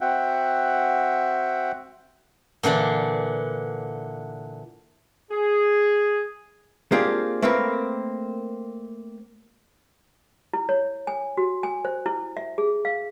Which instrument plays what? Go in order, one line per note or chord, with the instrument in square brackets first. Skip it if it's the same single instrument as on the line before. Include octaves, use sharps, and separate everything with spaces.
[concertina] C4 F#4 E5 F#5 G5
[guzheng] A#2 D3 E3 D4
[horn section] G#4
[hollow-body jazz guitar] A#3 C4 D4 F4 G4 G#4
A3 A#3 C4 A#4 B4
[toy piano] E4
C#5
G#5
F#4
G#5
C5
E4
E5
G#4
F5